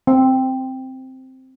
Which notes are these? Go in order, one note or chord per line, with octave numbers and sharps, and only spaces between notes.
C4